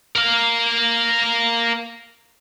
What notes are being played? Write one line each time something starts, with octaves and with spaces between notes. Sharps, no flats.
A#4 F5